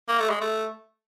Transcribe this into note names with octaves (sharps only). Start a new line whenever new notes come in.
A#3
A3
G#3
A3